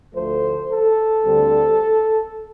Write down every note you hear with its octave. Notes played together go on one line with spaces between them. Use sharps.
D2 D3 F3 A3 C5
A4
D2 D3 G3 C4